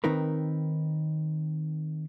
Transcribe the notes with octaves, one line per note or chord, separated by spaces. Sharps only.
D#3 C4 D#4 A#4 B4